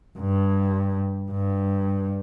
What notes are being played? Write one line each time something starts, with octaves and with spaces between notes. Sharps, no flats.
G2
G2